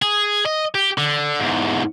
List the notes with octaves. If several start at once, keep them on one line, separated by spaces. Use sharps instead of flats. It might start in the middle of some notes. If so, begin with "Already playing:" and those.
G#4
D#5
G4
D3
E2 G#2